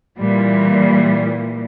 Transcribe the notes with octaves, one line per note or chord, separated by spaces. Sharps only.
A#2 E3 G3